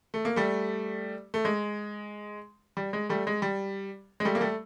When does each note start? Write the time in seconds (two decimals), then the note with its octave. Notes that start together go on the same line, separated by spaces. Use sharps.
0.14 A3
0.25 A#3
0.36 G3 A3
1.34 A3
1.45 G#3
2.77 G3
2.93 G#3
3.09 G3 A3
3.27 G#3
3.42 G3
4.20 G#3
4.25 G3 A3
4.35 A#3
4.41 G3 A3